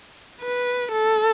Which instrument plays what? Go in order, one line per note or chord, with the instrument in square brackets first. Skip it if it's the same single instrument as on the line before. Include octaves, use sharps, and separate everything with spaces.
[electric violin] B4
A4